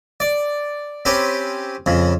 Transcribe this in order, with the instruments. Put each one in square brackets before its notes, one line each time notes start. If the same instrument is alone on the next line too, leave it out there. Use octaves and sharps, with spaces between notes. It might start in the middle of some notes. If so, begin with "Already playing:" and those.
[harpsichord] D5
C4 C#4 G4 B4
F2 C#3